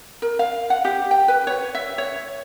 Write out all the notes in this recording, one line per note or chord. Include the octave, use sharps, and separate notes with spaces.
A#4
F5
F#5
G4
G5
B4
C#5
E5
C#5